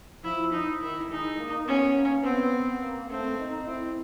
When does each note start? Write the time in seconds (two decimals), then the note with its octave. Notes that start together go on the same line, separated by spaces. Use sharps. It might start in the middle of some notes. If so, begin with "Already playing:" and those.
0.24 F3 E4
0.52 D#4
0.81 D#3 E4
1.10 G#3 D#4
1.38 A#3
1.67 B3 C#4
1.95 A#3
2.23 B3 C4
2.81 A#3
3.10 A3 C4
3.39 D#4
3.67 C4 E4